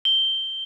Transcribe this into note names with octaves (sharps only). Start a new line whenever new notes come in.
G7